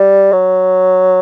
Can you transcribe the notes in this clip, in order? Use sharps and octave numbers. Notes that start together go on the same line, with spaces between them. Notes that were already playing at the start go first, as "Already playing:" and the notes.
Already playing: G3
F#3